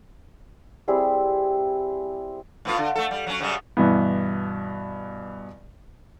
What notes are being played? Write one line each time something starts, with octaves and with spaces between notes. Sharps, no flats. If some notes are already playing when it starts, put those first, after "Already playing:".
G3 C4 E4 G#4
A2 B3 F4
D3
A3 A4
G3
F#3 C#4
F#2 C#3 G3
G2 B2 E3 B3